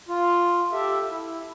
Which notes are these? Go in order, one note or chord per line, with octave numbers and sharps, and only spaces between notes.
F4
G4 A4 E5
E4